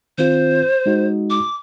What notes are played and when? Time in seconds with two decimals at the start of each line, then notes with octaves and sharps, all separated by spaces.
0.18 D#3 C4 F4 C5
0.86 G#3 D#4 F#4
1.30 D6